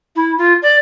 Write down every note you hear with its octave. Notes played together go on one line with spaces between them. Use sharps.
E4
F4
D5